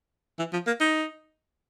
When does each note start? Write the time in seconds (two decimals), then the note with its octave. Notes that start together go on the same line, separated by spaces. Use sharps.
0.38 E3
0.53 F3
0.67 A#3
0.80 D#4